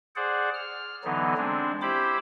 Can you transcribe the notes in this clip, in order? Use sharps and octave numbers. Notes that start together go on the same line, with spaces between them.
G#4 C5 D5 F#5
F6
D3 E3 F#3 B3 D#4
G#3 C4 D4
E4 G4 C5 B5 D6